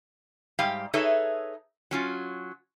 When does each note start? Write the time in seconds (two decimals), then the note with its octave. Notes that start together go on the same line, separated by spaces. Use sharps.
0.59 G#2 G3 G4 F5 G5
0.94 D#4 G#4 A4 B4 C#5 E5
1.91 F#3 C#4 F4